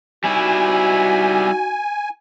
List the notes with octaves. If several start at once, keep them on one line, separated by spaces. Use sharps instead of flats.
G3 D#4 E4 F#4 G#5